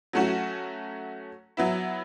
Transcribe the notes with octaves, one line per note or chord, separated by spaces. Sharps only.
F#3 A3 C#4 F#4
F#3 B3 E4